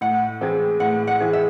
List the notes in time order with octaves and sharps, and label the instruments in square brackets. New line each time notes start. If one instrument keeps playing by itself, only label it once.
[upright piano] A2 [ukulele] F#5
[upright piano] E3 C4 E4 G#4
[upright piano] A2 [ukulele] F#5
[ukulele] F#5
[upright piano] E3 C4 E4 G#4
[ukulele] E5